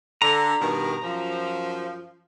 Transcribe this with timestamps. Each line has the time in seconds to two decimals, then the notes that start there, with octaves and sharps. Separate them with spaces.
0.22 D3 A#5
0.61 G2 B2 D#3
1.04 F#2 F3